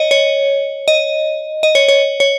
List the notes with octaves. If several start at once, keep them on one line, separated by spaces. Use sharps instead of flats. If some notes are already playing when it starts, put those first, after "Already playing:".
Already playing: C#5 D#5
C#5
D#5
D#5
C#5
C#5
C#5